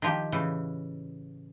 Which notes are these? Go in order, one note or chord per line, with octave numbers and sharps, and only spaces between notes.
D#3 F3 G4
A2 C#3 E3